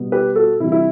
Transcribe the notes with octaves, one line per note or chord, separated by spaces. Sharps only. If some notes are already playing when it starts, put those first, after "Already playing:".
Already playing: B2 G3 B3
G4 B4
F#4 A4
C3 E3 G3 E4
E4